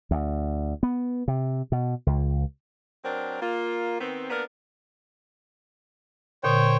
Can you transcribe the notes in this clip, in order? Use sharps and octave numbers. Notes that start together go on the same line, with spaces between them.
D2
B3
C3
B2
C#2
F#3 C4 D4 A#4
A#3 F4
D#3 B3 C4
A#3 B3 D4 A#4
A#2 D3 C5 C#5 G5